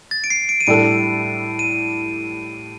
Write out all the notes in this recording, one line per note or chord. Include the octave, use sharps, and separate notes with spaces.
A6
D7
C7
D7
D#7
A2 G3 D4 A4 D7
D#7